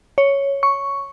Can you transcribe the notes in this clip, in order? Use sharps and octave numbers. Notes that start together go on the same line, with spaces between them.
C#5
C#6